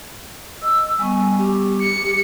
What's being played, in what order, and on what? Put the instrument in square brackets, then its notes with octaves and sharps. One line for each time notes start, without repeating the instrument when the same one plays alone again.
[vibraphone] D#5 [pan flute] E6
[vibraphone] G3 B3 C#6 [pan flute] G#5
[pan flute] G4
[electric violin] C#7